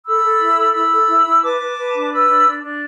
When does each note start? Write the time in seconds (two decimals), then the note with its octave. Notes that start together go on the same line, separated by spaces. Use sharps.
0.06 A4 B5 E6
0.24 A4
0.40 E4
0.58 A4
0.74 E4 B5 E6
0.91 A4
1.09 E4
1.26 E4
1.43 B4 A5 D6
1.60 B4
1.78 B4
1.94 D4
2.11 B4 B5 E6
2.28 D4
2.46 D4
2.62 D4